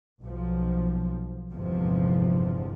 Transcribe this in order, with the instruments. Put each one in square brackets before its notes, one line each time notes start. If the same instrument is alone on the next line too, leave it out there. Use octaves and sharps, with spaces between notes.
[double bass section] B1 F3
G1 E2 G#2 C3 F3